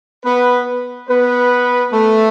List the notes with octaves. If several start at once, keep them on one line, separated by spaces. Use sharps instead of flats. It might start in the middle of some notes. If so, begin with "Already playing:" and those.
B3 B4
B3 B4
A3 A4